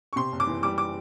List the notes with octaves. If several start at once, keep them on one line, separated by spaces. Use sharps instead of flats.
C#6
C3 C6
F#1
D6
E3
G3 D6
D6